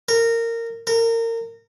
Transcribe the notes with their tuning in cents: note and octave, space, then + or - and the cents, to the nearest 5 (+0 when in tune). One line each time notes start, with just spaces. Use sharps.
A#4 -20
A#4 -30